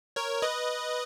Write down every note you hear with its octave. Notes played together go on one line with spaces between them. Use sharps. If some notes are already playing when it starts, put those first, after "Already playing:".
A#4 C#5
B4 D#5